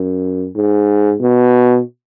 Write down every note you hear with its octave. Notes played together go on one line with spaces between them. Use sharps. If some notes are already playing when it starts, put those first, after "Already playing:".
Already playing: F#2
G#2
B2